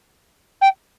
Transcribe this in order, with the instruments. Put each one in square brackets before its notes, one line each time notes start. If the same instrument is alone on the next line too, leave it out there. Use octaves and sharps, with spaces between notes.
[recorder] G5